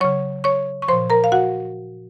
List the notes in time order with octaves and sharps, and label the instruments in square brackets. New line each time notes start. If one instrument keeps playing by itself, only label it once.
[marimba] C#3 F#3 C#5 C#6
C#5 C#6
C#6
F3 C5 C6
A#2
A#4 A#5
F5
F#4 F#5